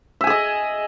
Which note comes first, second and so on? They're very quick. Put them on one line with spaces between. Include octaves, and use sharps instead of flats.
E5 G#5 G#4 D#5